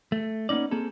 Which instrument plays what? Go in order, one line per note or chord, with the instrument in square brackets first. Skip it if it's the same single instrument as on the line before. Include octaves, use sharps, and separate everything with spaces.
[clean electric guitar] A3
A#3 B3 C#4 D#4 D5
A#3 C4 G#4 A4